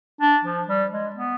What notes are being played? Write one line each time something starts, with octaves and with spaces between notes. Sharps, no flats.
D4
F3
G3
G#3
B3